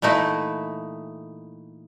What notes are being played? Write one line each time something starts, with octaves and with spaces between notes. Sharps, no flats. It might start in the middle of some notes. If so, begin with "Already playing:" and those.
A#2 E3 A3 D#4 E4